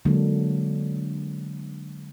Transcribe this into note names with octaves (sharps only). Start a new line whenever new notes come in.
D3 F#3 G#3 A#3 D4